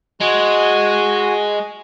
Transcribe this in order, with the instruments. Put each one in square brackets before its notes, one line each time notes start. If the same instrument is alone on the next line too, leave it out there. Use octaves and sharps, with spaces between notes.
[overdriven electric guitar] G#3 [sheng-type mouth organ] F#4 G#5